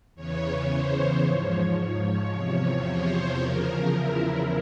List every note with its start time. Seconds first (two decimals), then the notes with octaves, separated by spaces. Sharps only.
0.15 E2 C#3 E3 C#5
0.69 C5
1.23 G#2 F3 C#5
1.78 C#5
2.32 E2 C3 F3 C#5
2.86 C5
3.40 E2 C#3 F3 A#4
3.95 E4